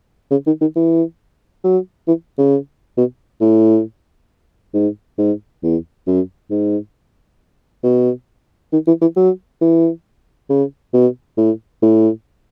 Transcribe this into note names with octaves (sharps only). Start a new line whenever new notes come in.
C#3
D#3
D#3
E3
F#3
E3
C#3
B2
A2
G#2
G#2
E2
F#2
G#2
B2
D#3
E3
E3
F#3
E3
C#3
B2
A2
A2